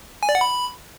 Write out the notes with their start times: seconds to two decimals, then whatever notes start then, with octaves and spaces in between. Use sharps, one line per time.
0.23 G#5
0.29 D5
0.35 F#5
0.41 B5